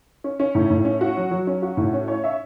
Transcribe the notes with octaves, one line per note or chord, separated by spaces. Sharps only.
C#4
C#4
A2
A2
C#4
F#4
F#3
F#3
C#4
F#4
A2
C#4
C#5
E5